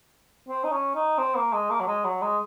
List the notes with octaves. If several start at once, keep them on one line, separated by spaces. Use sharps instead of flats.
C4
D#4
C#4
D#4
C4
A#3
G#3
A#3
F#3
G#3
F#3
G#3